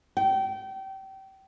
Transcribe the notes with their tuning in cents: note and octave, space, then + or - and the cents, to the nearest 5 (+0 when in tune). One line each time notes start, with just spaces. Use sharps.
G5 -25